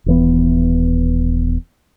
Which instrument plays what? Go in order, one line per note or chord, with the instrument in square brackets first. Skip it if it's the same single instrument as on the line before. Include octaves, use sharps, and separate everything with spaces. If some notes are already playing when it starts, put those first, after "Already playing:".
[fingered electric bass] D#1 E3 B3